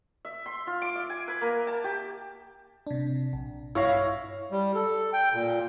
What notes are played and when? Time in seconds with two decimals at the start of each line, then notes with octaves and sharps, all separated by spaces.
0.25 E5
0.46 C6
0.67 F4
0.82 D6
0.95 E5
1.10 G#5
1.28 B4
1.41 A#3
1.67 A5
1.84 G4
2.87 C3 D4
3.33 A#1
3.75 G2 E4 C#5 F5 C#6 A#6
4.52 G3
4.75 A4
5.13 G5
5.33 A#2